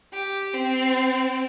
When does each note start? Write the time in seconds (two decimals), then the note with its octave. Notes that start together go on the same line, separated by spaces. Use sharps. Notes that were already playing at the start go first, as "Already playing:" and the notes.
0.13 G4
0.53 C4